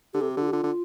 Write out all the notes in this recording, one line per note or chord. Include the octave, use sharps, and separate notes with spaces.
D3 G4
C3 A4
G4
D3
F4
G4
D3 F4
D3